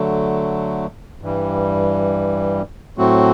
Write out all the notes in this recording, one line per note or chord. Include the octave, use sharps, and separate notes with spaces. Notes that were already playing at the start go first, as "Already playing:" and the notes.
Already playing: D3 F#3 A3
G2 E3 G3
A2 F#3 A3 C4 F#4